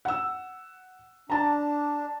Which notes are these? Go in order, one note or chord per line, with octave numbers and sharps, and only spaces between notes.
F#5 E6
D4 A5 A#5